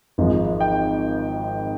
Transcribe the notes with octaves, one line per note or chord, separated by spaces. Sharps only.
G#1 G#2 F3 G#3
G5